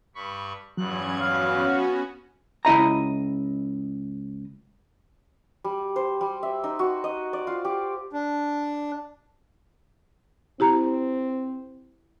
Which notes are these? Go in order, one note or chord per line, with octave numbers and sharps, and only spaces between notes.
G2 B5 C#6
E2 G2 F#3 C#4 F#6 G#6
B3 C#4 F#4 F5
C#2 E4 D#5 A#5
G3
C5
G3
E5
D#4
F#4
D#5
D5
F4
G4
D4
C4 E4 G4 A#5